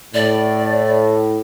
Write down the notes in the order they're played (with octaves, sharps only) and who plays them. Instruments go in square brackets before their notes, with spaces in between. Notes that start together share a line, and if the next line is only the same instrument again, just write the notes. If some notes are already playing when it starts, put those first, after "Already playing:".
[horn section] A2 [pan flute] D5